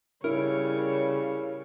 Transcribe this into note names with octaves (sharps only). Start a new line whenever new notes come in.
C#3 G3 E4 A#4 C#5